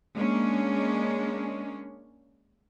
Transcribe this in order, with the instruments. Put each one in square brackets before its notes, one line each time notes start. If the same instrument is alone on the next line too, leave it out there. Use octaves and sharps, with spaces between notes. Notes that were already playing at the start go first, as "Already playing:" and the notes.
[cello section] G#3 A#3 C#4 D4